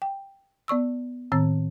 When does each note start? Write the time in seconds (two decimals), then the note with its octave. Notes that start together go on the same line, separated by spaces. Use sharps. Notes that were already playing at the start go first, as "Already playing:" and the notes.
0.02 G5
0.68 B3 D5 C#6 E6
1.32 A2 D#3 C4 A6